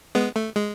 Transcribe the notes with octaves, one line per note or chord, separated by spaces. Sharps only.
G#3 B3
A3
G#3